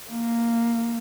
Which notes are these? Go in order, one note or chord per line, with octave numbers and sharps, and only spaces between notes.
A#3